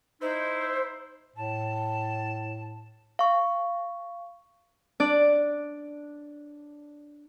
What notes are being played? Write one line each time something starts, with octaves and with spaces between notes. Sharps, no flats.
D#4 E4 C5
A2 A5
F5 C#6
D4 D5